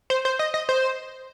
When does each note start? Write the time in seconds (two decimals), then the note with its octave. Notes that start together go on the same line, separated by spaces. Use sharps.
0.10 C5
0.25 C5
0.39 D#5
0.54 D#5
0.69 C5